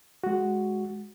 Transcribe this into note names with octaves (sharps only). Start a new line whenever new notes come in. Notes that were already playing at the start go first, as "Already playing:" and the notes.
G#3 F#4